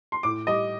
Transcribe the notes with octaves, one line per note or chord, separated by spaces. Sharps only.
C6
A2 D6
G3 D#5